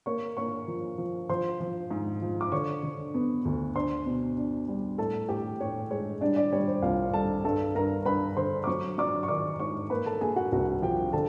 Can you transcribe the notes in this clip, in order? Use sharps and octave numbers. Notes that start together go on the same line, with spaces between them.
A#3 C#5 C#6
A#3 C#5 C#6
F3
F3
F3 C5 C6
F3
G#2
F3
D6
D3 C#5 C#6
D3
B3
D2
D4 C5 C6
B2
D4
G3
A2 A4 A5
A2 G4 G5
A2 C#5
G#3 C#5
G3 D4 D5
D4 D5
G3 C#5
C5
C2 F4 F5
G3 A4 A5
G2 A4 A5
G2 A#4 A#5
G2 B4 B5
D3 C5 C6
D6
F#3 C#5 C#6
F#3 D5 D6
C#6
D#3 D5 D6
G#2 C#5 C#6
A#3 B4 B5
A4 A5
A#3 G#4 G#5
F#4 F#5
C2 F#4 F#5
F3 G4 G5
D3 A4 A5